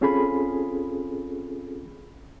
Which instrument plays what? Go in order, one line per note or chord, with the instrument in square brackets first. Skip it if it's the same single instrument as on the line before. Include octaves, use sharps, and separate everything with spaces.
[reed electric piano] C4 C#4 F4 G#4 A4 B5